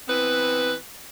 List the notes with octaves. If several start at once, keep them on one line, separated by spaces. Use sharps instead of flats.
E3 B3 C4 B4